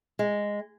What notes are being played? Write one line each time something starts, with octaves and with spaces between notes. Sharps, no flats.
G#3